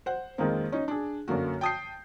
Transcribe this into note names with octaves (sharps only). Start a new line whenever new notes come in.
C5 F#5
F2 D#3 G#3 A#3 C4
C#4 D#4
D4 G#4
F#2 D3 A#3 F#4
G5 A5 D#6 G6 C7